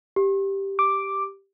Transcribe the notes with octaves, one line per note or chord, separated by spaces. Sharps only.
G4
D6